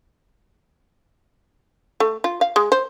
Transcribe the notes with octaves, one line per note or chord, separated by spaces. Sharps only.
A3
F4
F5
G#3
C5